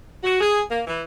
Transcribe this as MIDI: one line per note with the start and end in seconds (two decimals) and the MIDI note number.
0.23 0.40 66
0.41 0.62 68
0.70 0.80 58
0.87 1.02 52